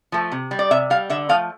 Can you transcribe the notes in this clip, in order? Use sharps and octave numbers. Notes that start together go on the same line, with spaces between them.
F3 A3
C3
G3
D5
C3 E5
G3 F5
D3 E5
F3 A3 F5